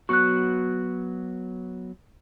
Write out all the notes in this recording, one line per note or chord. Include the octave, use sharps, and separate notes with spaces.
F#3 B3 F#4 C#6 F#6